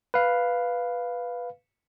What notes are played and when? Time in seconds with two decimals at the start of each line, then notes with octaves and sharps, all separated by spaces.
0.14 B4 F5